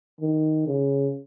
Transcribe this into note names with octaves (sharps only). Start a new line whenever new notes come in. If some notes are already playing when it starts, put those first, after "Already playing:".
D#3
C#3